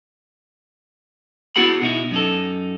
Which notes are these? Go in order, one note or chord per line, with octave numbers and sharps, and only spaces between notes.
B3 E4 F#4 G#4 F#5 B5
B2 D#4 E4
F#2 D#4 A4